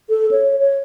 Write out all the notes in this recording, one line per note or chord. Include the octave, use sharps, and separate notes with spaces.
A4
C#5
C#5